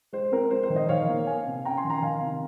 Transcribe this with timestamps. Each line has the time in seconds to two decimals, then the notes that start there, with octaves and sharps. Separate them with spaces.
0.13 G#3 C5
0.32 C4 A#4
0.51 G#3 C5
0.63 C5
0.70 D#3
0.76 C5 D#5
0.89 D#3 C#5 F5
1.09 A#3
1.26 A#3 F5 G#5
1.46 C3
1.65 C#4 G5 A#5
1.77 G#5 C6
1.84 D#3
1.90 G5 A#5
2.02 D#3 F5 G#5
2.22 C3